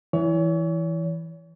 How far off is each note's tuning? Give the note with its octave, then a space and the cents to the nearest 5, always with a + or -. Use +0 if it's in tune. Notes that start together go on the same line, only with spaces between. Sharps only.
E3 +0 C#5 +40